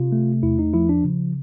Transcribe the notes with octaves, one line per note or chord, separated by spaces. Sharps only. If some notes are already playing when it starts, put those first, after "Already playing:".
Already playing: C3 F4
A3
E2 E4
D#4
F3 E4
D4
C#3